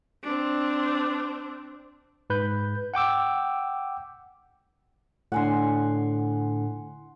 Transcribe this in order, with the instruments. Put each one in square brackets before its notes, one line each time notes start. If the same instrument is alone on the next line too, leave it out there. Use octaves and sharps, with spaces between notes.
[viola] C4 D4
[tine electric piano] G#2 B4 G6
F#5 G5 D6 E6
[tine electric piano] A2 D3 [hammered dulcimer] F#5 G#5 C6